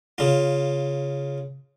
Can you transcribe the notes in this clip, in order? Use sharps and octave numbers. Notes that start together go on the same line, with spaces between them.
C#3 F4